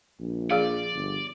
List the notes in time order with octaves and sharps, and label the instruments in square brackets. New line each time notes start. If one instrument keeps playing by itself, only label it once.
[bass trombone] A#1
[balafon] F3 G#4 F5 [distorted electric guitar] D5
[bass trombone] G1